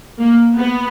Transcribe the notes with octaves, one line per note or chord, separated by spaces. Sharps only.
A#3
B3